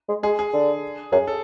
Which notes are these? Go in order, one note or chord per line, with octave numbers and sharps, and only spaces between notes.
G#3
G#3 G#4
G#4
D3
F#2 G#4
A4